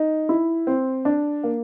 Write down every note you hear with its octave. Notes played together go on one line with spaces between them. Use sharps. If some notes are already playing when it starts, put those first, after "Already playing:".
Already playing: D#4
E4
C4
D4
A#3